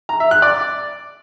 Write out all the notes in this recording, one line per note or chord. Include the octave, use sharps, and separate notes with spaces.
A#5
E5
F#6
D5